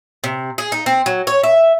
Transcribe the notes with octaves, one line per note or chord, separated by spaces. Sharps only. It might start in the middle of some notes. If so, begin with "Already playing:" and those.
C3
G#4
D#4
C4
F#3
C#5
E5